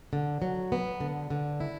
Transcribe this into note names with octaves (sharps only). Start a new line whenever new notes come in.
D3
F#3
B3
D3
D3
E4